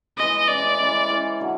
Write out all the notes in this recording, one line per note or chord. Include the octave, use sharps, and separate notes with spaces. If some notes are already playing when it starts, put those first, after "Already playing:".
E3 G#3 C#4 D#5
E3 G#3 C#4 D5
E3 G#3 C#4
E3 G#3 C#4
D3 F#3